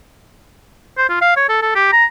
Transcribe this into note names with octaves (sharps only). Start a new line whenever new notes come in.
C5
F4
F5
C#5
A4
A4
G4
A#5